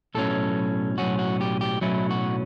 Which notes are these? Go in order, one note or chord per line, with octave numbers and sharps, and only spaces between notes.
B1 A2 F#3 C#4 A4
B1 A2 F#3 C#4 F#4
F#4
G4
G4
B1 A2 F#3 C#4 E4
F#4